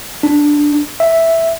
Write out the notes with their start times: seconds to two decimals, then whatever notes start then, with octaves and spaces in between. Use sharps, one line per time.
0.23 D4
1.00 E5